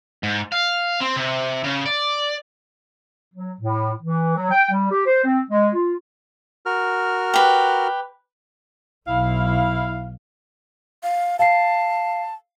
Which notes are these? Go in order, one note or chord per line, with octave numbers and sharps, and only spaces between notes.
G#2
F5
C4
C3
C#3
D5
F#3
A2
E3
F#3
G5
G3
G4
C5
C4
G#3
F4
F#4 A#4 F6
G4 B4
B1 E4 F5
F5
F5 A5 C7